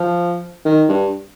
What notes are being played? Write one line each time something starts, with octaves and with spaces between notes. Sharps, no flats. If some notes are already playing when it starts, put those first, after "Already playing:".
Already playing: F3
D#3
G2